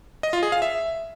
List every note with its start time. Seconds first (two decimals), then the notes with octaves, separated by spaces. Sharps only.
0.23 D#5
0.33 F4
0.43 G#4
0.52 F5
0.62 E5